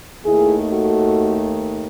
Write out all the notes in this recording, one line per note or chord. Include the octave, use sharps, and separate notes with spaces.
D#2 D#3 A3 E4 G#4
F#4 A4